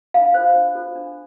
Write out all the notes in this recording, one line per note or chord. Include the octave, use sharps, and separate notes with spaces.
D4 F5
F4 A4 C5
D4
F4 A4 C5
D4